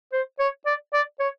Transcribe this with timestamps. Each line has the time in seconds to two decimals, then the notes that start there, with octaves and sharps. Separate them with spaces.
0.13 C5
0.40 C#5
0.66 D5
0.93 D5
1.20 C#5